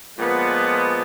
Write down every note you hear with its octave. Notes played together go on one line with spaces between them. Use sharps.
A#2 F3 G#3 B3